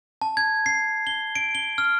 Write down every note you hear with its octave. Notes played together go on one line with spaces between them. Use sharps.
A5
G#6
C7
G7
D7
G7
F6